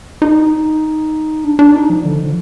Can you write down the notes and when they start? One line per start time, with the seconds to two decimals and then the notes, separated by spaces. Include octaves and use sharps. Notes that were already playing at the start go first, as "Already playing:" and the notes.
0.22 D#4
1.44 D4
1.59 D4
1.74 D#4
1.90 F3
2.05 D3
2.20 F3